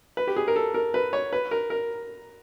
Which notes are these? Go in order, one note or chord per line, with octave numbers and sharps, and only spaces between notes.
B4
G4
G#4
A#4
A4
A#4
B4
C#5
B4
A#4
A#4